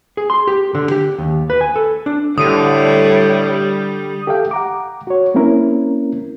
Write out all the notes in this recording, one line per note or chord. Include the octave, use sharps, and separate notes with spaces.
G#4
C6
G4
D3
G4
D#2
B4
G#5
A4
D4
A2 D3 G3 D#6 D#7
G4 A4 E5 F5 G5
F#5 A#5 D6
F#4 C#5
A#3 C4 C#4 E4 A#4